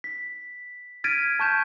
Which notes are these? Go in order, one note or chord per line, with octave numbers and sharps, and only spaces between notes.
B6
F6 G#6 A6 B6 D7 D#7
A5 C#6 G6 E7